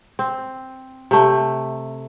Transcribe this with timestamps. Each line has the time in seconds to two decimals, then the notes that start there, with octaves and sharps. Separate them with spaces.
0.19 C4
1.11 C3 A3